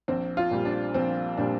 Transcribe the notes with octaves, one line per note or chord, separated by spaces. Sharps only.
A#1 C4
F4
A#2 G3
D4
A#1 C4
A#2 G3 D4